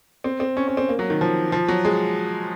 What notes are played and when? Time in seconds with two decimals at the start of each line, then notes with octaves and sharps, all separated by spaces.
0.24 C4
0.40 C4
0.57 C#4
0.68 C#4
0.77 C4
0.89 A#3
0.99 F#3
1.10 D#3
1.21 F3
1.52 F3
1.68 F#3
1.85 G#3